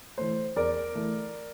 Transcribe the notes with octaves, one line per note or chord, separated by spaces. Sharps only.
E3 A3 C5
E2 A#4 D5
E3 A3